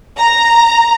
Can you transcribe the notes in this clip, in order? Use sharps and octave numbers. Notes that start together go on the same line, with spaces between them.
A#5